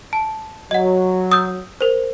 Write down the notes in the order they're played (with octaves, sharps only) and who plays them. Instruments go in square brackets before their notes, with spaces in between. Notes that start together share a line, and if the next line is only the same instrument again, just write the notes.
[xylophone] A5
[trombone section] F#3 [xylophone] D#5 F#5
[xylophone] D#6 E6 G6
A#4 C5